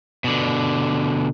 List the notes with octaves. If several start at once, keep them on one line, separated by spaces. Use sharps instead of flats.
B2 D3